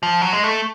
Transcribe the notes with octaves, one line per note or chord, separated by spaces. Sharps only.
F3
F#3
G#3
A3